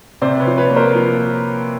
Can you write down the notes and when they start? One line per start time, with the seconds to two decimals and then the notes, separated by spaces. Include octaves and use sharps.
0.21 C3 C5 D5
0.40 B4 C#5
0.46 F3
0.58 B4 C#5
0.70 A#3
0.76 A#4 C5
0.94 F3